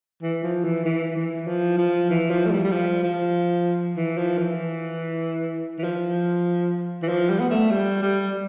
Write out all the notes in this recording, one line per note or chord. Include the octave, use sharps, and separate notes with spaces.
E3
F3
E3
E3
E3
F3
F3
E3
F3
A3
G3
G3
F3
F3
E3
F3
E3
E3
F3
E3
F3
G3
B3
A3
G3
G3